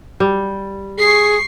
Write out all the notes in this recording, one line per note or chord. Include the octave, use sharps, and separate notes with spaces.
G3
G#4 C#6 C7